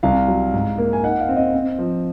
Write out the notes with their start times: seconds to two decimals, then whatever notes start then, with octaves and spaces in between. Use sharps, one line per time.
0.03 C2 F5
0.28 F#3
0.53 G#2
0.78 A#3
0.93 G#5
1.03 D#4 F#5
1.21 F5
1.29 C4
1.36 D#5
1.54 C4
1.79 F3